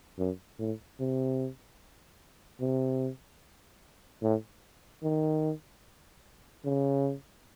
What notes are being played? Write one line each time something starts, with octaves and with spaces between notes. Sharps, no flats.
F#2
A2
C3
C3
A2
D#3
C#3